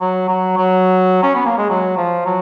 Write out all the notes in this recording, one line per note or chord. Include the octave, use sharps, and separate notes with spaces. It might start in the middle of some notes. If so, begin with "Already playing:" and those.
F#3
F#3
F#3
C#4
B3
A#3
G#3
F#3
F3
F#3